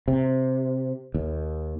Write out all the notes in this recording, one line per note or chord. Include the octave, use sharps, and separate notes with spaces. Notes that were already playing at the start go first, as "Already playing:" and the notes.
C3
D#2